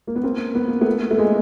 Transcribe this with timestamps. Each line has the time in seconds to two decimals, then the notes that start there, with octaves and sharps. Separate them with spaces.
0.07 A#3
0.16 B3
0.23 A#3 C4
0.55 B3
0.68 A#3
0.81 A3 B3
1.11 A3
1.18 G#3 A#3